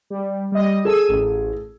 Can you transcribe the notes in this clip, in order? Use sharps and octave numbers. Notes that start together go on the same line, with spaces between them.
G3
G3 D#5
G#4 A4 E6 D#7
A1